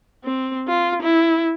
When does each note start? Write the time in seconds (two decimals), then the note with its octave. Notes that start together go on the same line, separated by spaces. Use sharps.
0.24 C4
0.68 F4
1.02 E4